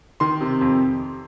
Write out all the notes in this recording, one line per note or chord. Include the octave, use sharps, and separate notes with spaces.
D#3 C6
C3
F2